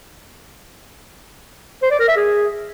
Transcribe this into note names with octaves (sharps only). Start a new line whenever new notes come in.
C5
D5
A#4
E5
G#4